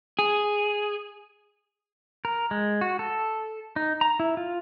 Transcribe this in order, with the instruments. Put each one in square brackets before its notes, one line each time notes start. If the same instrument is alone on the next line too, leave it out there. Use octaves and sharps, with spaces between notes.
[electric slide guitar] G#4
[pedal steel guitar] A#4
G#3
F#4
A4
D#4
A#5
E4
F4